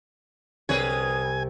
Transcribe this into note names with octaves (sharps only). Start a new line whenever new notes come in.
C2 G#4 B4 C#5 G#5